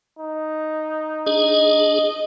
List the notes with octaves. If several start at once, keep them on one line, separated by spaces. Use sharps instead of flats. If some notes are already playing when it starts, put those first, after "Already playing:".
D#4
D4 G#4 D#5